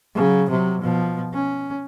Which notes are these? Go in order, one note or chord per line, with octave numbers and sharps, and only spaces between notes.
C#3 F#3
C3 F#3
B2 F3
C#4